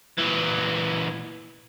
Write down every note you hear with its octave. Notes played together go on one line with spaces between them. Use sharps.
A#2 E3